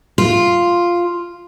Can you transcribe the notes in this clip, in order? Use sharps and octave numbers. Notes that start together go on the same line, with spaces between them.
F4